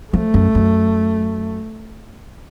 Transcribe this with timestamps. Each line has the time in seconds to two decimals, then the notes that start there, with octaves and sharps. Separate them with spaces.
0.13 F3 A3
0.34 F#2
0.55 F#2